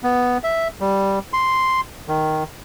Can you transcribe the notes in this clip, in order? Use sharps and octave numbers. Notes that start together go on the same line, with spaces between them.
B3
E5
G3
C6
D#3